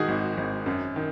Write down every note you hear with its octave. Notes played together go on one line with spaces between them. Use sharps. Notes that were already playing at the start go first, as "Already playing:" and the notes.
Already playing: G#2 D#3 D#4 F#4 G#4
G#1
G#1
F#2
D#3